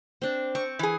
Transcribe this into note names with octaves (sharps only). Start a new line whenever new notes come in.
C4 D4
C4 C#6
E3 G#4